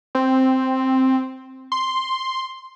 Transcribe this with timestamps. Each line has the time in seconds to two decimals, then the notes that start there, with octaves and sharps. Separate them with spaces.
0.15 C4
1.72 C6